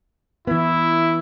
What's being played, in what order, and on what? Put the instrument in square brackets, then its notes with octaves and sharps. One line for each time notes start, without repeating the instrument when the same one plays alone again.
[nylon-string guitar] E3 B3 [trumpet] E4